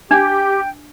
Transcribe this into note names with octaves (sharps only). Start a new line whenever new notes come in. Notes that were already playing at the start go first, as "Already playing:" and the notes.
D4 G4 G5